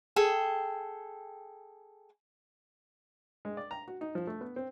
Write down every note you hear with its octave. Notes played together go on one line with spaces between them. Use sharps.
G#4 A4 G5
G#3
D5
A#5
F#4
D#4
F3
A3
B3
C4